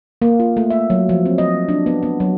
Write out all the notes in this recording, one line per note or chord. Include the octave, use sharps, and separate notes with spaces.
A#3
F4
A3
E5
F#3
F3
C4
D#5
D4
B3
B3
F#3